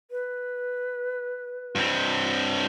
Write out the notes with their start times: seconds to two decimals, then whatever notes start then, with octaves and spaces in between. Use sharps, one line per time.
0.11 B4
1.75 G2 C4